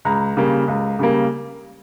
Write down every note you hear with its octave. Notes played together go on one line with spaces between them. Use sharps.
C#2 A#5
C#3 G3 A#3
C#2
C#3 G3 A#3